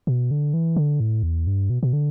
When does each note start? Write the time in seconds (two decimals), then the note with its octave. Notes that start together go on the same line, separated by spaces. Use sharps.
0.07 B2
0.31 D3
0.54 E3
0.76 D3
1.00 A2
1.23 E2
1.47 G2
1.70 B2
1.83 B2
1.93 D3